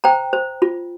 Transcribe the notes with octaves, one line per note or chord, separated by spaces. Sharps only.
C5 G5 A#5
C5
F4